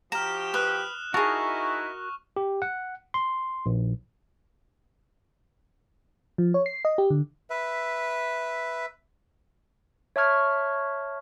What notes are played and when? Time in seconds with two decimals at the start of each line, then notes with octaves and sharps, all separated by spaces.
0.12 F3 F#4 G4 A#5 F6 E7
0.54 B4 D#6 F#6
1.14 D#4 E4 F#4 G#4 A#4 A5 C#6
2.36 G4
2.62 F#5
3.14 C6
3.66 A#1
6.38 F3
6.54 C#5
6.66 C7
6.85 D#5
6.98 G4
7.10 D3
7.50 B4 E5
10.16 C#5 E5 A5 C#6 F6 G#6